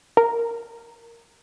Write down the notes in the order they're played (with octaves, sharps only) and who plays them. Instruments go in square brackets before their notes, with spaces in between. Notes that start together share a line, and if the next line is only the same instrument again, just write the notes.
[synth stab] A#4